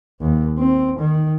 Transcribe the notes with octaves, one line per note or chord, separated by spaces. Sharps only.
D#2
C4
D#3